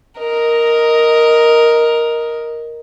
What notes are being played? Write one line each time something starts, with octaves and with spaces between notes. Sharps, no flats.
A#4 D#5